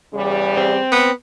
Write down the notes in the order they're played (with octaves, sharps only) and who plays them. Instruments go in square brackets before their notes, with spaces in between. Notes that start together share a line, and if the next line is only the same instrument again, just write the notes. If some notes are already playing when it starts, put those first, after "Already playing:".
[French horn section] E2 C#3 G3
[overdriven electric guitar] C4
[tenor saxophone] B3